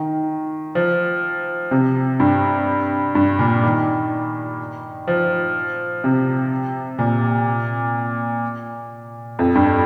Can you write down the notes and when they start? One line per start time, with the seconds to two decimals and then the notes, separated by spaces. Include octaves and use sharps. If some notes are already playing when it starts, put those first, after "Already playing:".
Already playing: D#3
0.75 F3
1.71 C3
2.20 G2
3.15 G2
3.39 A#2
3.63 D#3
5.08 F3
6.04 C3
6.99 A#2
9.39 F2
9.55 G2